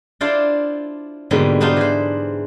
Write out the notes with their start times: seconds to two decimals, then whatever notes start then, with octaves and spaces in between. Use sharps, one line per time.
0.21 D4 E4 F4 C5 D5
1.31 G#2 B2 D3 G3 G#3 A#3
1.61 B3 D4 D#4 F4 C5
1.77 E3 C5